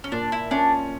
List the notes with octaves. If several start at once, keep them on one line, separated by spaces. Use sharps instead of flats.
C#4
A#2 D4
E4
C#4 D4